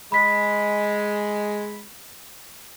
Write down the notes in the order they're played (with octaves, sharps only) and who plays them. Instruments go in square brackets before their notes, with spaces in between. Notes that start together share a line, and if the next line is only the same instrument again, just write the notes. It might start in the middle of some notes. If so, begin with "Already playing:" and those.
[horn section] G#3 [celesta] B5 B6